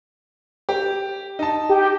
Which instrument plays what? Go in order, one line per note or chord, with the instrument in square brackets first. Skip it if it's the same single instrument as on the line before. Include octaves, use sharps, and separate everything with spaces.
[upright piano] G4
D#4 A5
[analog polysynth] G4 G5